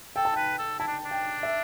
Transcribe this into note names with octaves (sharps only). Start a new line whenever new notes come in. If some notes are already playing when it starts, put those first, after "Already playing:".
A4 G5
A5
B4 G5
A4
E4 A5
D4
D4
G5
E5